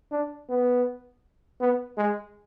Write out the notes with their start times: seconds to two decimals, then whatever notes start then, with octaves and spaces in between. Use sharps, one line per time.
0.11 D4
0.49 B3
1.61 B3
1.97 G#3